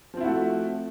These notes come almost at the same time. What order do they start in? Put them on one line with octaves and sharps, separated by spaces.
F3 C4 E4 F#4 A3